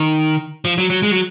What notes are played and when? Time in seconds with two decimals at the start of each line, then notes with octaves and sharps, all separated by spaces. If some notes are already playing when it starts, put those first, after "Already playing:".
Already playing: D#3
0.65 F3
0.78 F#3
0.90 F#3
1.03 G#3
1.11 F#3